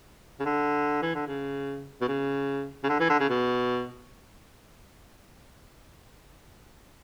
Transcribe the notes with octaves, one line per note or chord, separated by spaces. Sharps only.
C#3
D3
E3
D3
C#3
B2
C#3
C#3
D3
E3
D3
C#3
B2